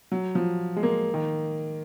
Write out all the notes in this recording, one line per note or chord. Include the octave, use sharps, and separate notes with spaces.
F#3
F3
G#3
A#3
D#3